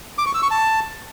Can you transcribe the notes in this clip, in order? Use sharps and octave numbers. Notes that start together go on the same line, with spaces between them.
D6
C#6
E6
C#6
A5